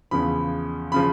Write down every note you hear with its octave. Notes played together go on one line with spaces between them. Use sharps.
E2 C#3 F3 B5
C#3 F3 B5